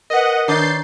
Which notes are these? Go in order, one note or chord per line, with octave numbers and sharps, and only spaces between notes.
A#4 B4 D#5 F#5
D#3 D4 C#5 G6 A6 C7